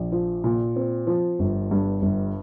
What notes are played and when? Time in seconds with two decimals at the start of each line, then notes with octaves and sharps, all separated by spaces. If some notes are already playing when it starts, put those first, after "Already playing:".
Already playing: A#1
0.12 F3
0.44 A#2
0.76 C4
1.07 F3
1.39 G1
1.71 G2
2.02 G1